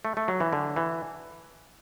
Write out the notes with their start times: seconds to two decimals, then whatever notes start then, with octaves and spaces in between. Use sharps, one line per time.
0.05 A3
0.17 A3
0.28 F#3
0.40 E3
0.53 D3
0.76 E3